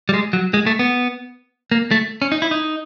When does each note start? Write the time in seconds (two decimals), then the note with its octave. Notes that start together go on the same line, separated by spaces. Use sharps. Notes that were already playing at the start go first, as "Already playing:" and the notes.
0.09 G3
0.14 G#3
0.33 F#3
0.54 G#3
0.67 A3
0.79 B3
1.71 A#3
1.91 A3
2.22 C#4
2.32 D#4
2.42 E4
2.51 D#4